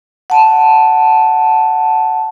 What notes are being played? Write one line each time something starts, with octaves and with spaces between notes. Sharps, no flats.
F#5 A5